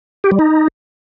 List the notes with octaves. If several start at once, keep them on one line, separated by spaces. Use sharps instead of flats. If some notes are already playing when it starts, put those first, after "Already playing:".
G4
G3
D#4